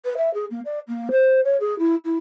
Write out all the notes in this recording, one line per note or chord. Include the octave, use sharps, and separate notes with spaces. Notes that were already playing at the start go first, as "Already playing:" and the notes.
B4
E5
G#4
A#3
D5
A#3
C5
C#5
G#4
E4
E4